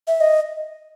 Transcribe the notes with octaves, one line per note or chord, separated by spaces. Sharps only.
E5
D#5